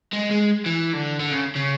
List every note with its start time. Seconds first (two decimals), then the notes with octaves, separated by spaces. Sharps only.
0.13 G#3
0.31 G#3
0.66 E3
0.94 D3
1.20 D3
1.31 C#3
1.56 C#3